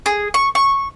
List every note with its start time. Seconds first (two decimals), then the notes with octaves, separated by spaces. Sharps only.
0.06 G#4
0.34 C#6
0.55 C#6